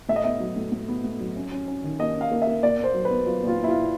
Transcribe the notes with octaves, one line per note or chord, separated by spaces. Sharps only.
A2 E5
D#5
B3 E5
F#3
A2
A2
B3
A2
F#3
C#4
C#4
C#4
D#3
A#3 D#5
C#4
F5
A#3
E5
A#3
A#2 D5
A#2 C5
F#3
B4
B3
F#3 F4
A#2 F4
A#2
E4
F4
A#2